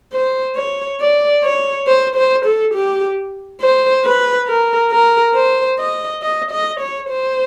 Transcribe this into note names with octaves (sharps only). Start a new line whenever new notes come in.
C5
C#5
D5
C#5
C5
C5
A4
G4
C5
B4
A#4
A#4
C5
D#5
D#5
D#5
C#5
C5